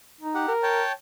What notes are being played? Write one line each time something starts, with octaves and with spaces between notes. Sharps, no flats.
D#4
G4 F#5
A#4
C#5 G5 A5